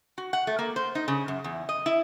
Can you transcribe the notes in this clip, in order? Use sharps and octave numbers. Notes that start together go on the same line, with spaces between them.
F#4
F#5
A3
A#3
C5
D#4
C#3
F#2
E2
D#5
E4